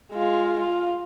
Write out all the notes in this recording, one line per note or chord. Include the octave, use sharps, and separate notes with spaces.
G#3 F4
F4